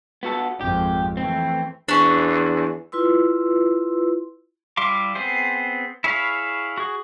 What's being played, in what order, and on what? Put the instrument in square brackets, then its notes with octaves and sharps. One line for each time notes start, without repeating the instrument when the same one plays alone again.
[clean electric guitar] B3 F#4 A4
[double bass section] G#1 F2 [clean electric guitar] G4
[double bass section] E3 A3 [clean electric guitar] C4
[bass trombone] E2 [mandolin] C#4 D4
[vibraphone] E4 F4 B4 C6 E6
[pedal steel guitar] G3 E4 F5 C6 D6
B3 C4 G#4 C5
E4 G#4 C#5 F5 B5
F#4 G#4